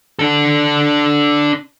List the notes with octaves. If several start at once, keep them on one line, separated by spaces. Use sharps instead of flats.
D4 A4